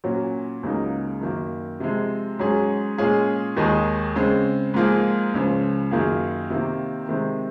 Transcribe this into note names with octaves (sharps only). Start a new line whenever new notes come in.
A#2 F#3 C#4 F#4
C#2 C#3 F#3 A#3 D#4
F#2 D#3 A#3
C3 F3 G#3
G#2 F#3 C#4 G#4
A#2 G#3 C#4 F4 G#4
D#2 D#3 G#3 D#4 G#4
C#3 G#3 C4
G#2 F3 A#3 F4 G#4
C#2 C#3 F3
F#2 D#3 A#3 F4 G#4
C3 D#3 A#3
C3 D#3 G#3 C4